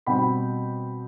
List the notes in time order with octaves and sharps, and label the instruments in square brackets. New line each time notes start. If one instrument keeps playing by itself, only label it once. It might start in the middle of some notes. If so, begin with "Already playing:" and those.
[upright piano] B2 G3 C4 G5 B5